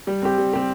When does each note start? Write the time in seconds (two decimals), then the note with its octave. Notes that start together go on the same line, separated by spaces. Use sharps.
0.07 G3
0.22 C4 G4
0.38 G3
0.53 C4 G4